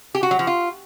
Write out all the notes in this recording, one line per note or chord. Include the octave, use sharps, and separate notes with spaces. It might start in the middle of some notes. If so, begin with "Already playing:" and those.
G4
F#4
F#3
F3
F4